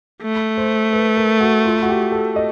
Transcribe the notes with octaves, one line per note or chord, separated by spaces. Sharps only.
A3
C5
B4
A#4
F#4
F4
F#4
G4
A4
D#5